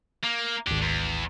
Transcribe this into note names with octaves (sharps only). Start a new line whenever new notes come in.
A#3
G#1 D2 D4 G4
E2